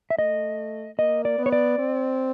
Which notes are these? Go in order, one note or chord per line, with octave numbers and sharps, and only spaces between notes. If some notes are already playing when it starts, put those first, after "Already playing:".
E5
A3 D#5
A#3 D#5
D5
B3
C#5
D5
C4